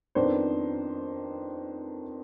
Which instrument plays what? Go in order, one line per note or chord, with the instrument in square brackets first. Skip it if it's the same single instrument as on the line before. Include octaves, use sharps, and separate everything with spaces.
[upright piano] F2 D#3 B3 D4 C5